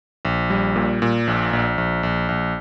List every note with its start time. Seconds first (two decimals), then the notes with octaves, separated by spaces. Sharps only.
0.25 A#1
0.50 G3
0.76 A#2
1.02 A#2
1.27 A#1
1.53 A#1
1.78 A#1
2.03 A#1
2.29 A#1